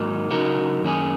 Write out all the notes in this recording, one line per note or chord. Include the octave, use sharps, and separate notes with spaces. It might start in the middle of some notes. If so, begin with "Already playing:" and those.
Already playing: G#2 D#3 F#3 A#3 D#4
C#3 F#3 D#4 F#4 A#4
F#2 D#3 A#3 C#4 G#4